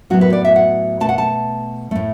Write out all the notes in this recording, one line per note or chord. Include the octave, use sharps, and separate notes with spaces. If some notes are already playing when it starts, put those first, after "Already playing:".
A2 F#3 B3 F#4
B4
D5
E5
F#5
B2 A3 A5
F#5
A5
A2 A3